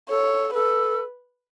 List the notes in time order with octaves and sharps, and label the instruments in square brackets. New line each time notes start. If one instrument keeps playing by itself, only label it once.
[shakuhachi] A4 [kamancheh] C#5
[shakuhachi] A4 [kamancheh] B4